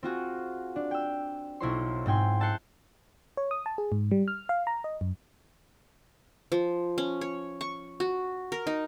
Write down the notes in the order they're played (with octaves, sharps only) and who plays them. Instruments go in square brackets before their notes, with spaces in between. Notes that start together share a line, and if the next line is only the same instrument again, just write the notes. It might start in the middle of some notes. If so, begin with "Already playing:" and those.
[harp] C4 F4 F#4 G#4
D4
G5 E6
B1 E4 F4 C5 C#5 C6
G#2 C4 G5 G#5 C6
E5 A5 F#6 G6 C7 C#7
[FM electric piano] C#5
D#6
A5
G#4
G#2
G3
F6
F5
A#5
D#5
F#2
[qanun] F3
C#4
C#5
C#6
F#4
A#4
D#4